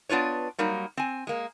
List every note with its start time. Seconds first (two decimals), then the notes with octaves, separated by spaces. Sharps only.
0.09 B3 D4 F4 B4 C#5
0.58 F#3 G3 A#3 D#4
0.97 C4 G#5
1.27 G#3 A#3